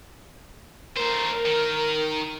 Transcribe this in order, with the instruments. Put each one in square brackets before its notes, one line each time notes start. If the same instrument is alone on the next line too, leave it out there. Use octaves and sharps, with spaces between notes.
[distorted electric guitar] A3 C5 [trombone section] A#4
[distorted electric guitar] D#3